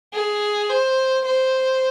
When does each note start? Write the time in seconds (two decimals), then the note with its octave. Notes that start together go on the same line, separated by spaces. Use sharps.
0.13 G#4
0.69 C5
1.25 C5